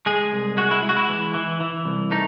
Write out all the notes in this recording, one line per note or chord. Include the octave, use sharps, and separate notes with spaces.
G#3 G#4
C2
G#3 F#4
E4
G#3
F#4
E4
E3
E3
E3
C2
A3 D#4